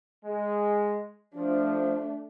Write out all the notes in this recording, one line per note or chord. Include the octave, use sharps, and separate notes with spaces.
G#3
F3 A3 D4